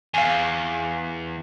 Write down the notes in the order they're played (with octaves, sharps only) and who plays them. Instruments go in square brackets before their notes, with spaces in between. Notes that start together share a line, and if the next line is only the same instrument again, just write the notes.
[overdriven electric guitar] E2 [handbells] F5 G#5